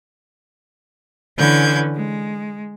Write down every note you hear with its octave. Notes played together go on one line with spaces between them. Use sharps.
D3 E3 C#4 B4 G6 G#6
G#3